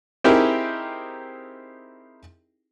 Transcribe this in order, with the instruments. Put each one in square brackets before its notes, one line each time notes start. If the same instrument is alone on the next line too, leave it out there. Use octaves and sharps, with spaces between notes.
[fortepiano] C4 D#4 E4 G4 G#4 A#4